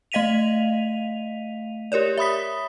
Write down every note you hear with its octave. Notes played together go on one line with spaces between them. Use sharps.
A3 D#5 F5 B6 D#7 F7
G4 A#4 C#5 D5
E5 B5 D#6 B6